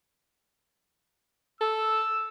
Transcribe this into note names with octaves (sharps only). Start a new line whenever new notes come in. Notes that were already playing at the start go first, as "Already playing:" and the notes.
A4 E6